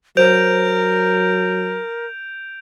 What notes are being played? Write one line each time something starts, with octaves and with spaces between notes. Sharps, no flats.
F#3 A#4 C5 G6 D7 F7